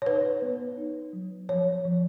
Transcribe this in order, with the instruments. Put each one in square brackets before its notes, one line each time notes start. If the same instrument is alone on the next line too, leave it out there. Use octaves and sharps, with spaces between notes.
[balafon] C#5
D#4 B4
B3
D#4
F#3
F3 C#5
F3